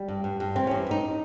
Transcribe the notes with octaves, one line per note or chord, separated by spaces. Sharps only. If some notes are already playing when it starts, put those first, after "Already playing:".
Already playing: G3
G2
G2
G2
E3 C4
G2 C#4
G2 D#4